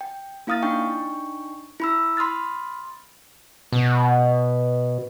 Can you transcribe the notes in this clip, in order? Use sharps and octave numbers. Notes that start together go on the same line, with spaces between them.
G5
A#3 E4 F5 D#6 F6 A6
D4 D#4 G5 C#6
E4 B5 E6
B5 C6 D#6 F6 A6
B2